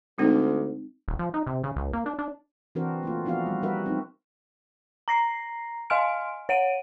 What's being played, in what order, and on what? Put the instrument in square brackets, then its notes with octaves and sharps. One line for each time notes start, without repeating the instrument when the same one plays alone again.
[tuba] D2 [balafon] G#3 C4 D#4
[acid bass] D#1
F3
D#4
C3
C#3
C#2
A#3
D4
D4
[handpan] E3 C4 D4 F#4 A#4 C5
A3 A#3 F4
F3 B3 D4 E4 F#4 F5
G3
G3 D4 F#4 A#4 B4 E5
C4 D#4
[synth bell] A#5 A#6 C7
D#5 F5 G#5 C6 F6 D7
C#5 F#5 D7 D#7